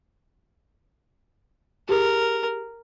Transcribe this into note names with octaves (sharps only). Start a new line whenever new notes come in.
G4 G#4 A#4